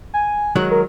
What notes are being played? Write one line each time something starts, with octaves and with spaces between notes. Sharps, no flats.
G#5
D#3 F#3 G#3 F#6
A#4